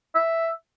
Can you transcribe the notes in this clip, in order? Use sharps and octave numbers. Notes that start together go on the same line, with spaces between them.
E5